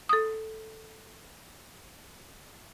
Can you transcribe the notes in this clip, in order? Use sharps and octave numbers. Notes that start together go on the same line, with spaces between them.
A4 D#6